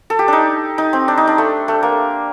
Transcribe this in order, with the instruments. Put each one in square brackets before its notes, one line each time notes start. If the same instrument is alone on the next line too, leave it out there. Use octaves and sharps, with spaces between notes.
[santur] A4
G4
D4 D#4
D#4
C4
D4
D#4
D4
A3
A3
A#3